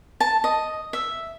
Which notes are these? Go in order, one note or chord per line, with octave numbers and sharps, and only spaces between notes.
A5
D#5
E5